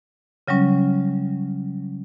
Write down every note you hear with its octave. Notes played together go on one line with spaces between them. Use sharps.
C#3 F#3 G3 C#4